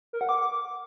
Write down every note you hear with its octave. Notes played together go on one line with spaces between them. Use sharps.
A#4
F#5
D6